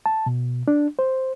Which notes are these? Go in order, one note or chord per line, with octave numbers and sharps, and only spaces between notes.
A5
B2
D4
C5